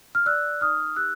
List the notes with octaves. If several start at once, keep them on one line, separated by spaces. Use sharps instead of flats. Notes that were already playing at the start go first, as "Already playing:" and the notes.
F6
D5 E6 F#6
D#4 D#6 F6
G4 E6 F#6